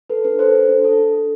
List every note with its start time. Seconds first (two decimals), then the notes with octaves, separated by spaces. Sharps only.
0.10 A4 B4
0.24 D4 B4
0.39 A4 C5
0.55 A4
0.69 D4
0.84 A4
0.99 D4
1.15 A4